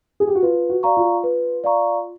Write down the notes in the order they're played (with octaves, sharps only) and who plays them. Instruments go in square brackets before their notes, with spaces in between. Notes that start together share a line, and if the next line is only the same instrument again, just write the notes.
[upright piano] G#4
G4
F#4
[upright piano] F4 [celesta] B4
[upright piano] F#4
[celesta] D5 F5 A#5 C#6
[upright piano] F4
[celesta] B4
D5 F5 A#5 C#6